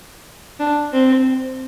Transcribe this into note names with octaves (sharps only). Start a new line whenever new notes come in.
D4
C4